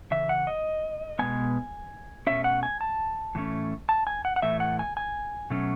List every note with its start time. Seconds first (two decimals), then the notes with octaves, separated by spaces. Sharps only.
0.11 C#3 E3 E5
0.29 F#5
0.47 D#5
1.19 B2 G#3 B3 G#5
2.27 B2 A3 C#4 E5
2.44 F#5
2.63 G#5
2.81 A5
3.35 A2 E3 A3 C#4
3.89 A5
4.07 G#5
4.25 F#5
4.36 F#5
4.42 A2 E3 A3 E5
4.60 F#5
4.79 G#5
4.97 G#5
5.50 B2 F#3 A3 C#4